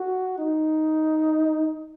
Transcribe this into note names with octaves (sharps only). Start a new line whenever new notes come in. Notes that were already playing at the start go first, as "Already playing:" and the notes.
Already playing: F#4
D#4